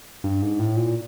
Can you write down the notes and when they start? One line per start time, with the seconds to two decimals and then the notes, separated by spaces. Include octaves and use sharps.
0.24 G2
0.42 G#2
0.59 A2
0.76 A#2